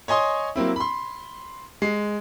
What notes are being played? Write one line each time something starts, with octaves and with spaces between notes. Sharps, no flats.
C#5 D#5 G#5 C6 D#6
F#3 A#3 C4 E4
B5 C6
G#3 C7